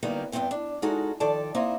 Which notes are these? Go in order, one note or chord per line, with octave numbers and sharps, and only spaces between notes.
D3 F#3 G3 A#3 B3 D#4
E2 G2 F#3 B3 C4 G5
D4
G#3 D#4 F#4 A4 A#4
D#3 F3 A4 D5 A5
A#3 C4 D#4 E4 D#5